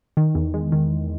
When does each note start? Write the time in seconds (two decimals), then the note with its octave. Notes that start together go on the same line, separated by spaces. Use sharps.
0.17 D#3
0.35 E2
0.54 G#3
0.72 D#3